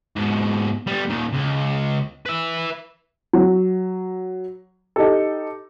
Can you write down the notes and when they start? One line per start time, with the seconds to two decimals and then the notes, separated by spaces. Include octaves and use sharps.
0.16 G#2 B2
0.87 G3 B3
1.09 A#2 D#3
1.32 C#2
2.26 B4 E5
3.33 F#3
4.96 D#4 G4 A4